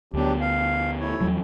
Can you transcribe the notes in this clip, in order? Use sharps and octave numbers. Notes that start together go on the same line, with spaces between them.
D2 F#3 B3 D4 G4
F5
A3 E4 C#5
E2 F3 F#3